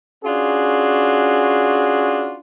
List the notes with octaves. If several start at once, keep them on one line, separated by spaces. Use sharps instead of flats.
C#4 D4 F4 F#4 G#4